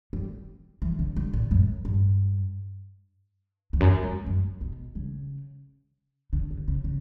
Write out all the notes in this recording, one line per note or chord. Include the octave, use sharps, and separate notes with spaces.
G3
E3
D3
D3
A#2
F#2
G2
E2
F#2
E2
F#2
B2
C#3
D3
C#3
C#3
C#3